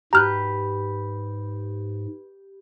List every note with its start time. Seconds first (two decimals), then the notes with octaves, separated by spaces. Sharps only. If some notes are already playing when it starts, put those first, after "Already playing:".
0.13 G#2 G4 B4 A#5 F6 F#6